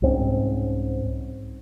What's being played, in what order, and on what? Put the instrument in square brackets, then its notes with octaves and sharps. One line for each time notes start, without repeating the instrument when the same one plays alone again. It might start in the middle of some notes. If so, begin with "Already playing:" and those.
[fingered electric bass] C2 G#2 C4 C#4